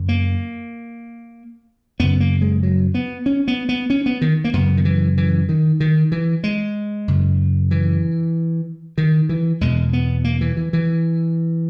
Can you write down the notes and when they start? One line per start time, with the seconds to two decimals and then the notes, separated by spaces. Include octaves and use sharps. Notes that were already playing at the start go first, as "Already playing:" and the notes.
Already playing: F#2 C#3
0.09 A#3
1.99 F#2 C#3 B3
2.20 A#3
2.42 G#3
2.63 F#3
2.94 B3
3.26 C#4
3.48 B3
3.69 B3
3.90 C#4
4.06 B3
4.21 D#3
4.44 A#3
4.53 F#2 C#3 B3
4.77 D#3
4.85 E3
5.17 E3
5.49 D#3
5.80 D#3
6.12 E3
6.44 G#3
7.08 F#2 C#3
7.71 E3
8.98 D#3
9.29 E3
9.61 E2 B2 G#3
9.93 B3
10.24 A#3
10.41 E3
10.57 E3
10.73 E3